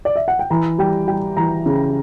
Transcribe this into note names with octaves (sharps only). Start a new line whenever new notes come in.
D5
E5
F#5
G5
E3 A#5
G3 G5
G3 G5
E3 A#5
C#3